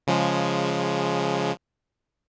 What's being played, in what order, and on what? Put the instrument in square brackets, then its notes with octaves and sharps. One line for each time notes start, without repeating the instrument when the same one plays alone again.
[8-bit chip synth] C#3 F3 G#3